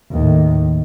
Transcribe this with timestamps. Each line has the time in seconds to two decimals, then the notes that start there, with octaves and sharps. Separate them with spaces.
0.12 D#2 A2